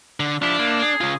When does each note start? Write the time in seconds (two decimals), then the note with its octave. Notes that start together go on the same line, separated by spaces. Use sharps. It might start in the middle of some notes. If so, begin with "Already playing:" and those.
0.20 D3
0.42 F3 D4 E4 G4
0.59 A#3 E4
0.82 G#4
1.01 C#3 F4